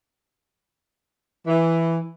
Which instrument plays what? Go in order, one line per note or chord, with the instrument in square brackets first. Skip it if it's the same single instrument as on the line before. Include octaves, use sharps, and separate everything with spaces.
[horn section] E3